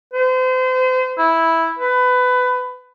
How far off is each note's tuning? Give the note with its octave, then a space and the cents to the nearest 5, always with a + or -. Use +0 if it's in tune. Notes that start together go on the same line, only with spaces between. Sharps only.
C5 -35
E4 -5
B4 +20